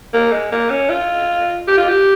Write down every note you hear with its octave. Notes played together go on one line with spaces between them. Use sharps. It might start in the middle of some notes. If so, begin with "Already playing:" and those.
A#3
G#3
A#3
C#4
F4
G4
F4
G4